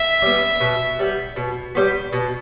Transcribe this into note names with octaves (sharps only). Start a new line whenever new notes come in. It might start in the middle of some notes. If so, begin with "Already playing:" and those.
Already playing: E5
G3 B3
B2
G3 B3
B2
G3 B3
B2